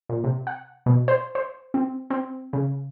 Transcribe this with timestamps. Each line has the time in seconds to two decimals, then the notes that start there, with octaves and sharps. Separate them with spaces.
0.09 A#2
0.24 C3
0.47 F#5
0.86 B2
1.08 C5
1.35 C5
1.74 C4
2.10 C4
2.53 C#3